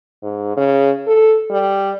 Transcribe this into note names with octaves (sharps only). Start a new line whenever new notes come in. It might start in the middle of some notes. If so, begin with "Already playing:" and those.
G#2
C#3
A4
G3